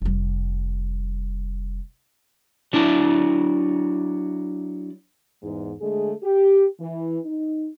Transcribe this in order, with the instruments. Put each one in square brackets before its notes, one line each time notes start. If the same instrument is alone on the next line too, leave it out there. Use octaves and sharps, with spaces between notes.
[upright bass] F1 G3
[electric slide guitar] F#3 D4 E4 A5
[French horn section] E2 G#2
D3 G#3 A3 G#4
G4
E3
D#4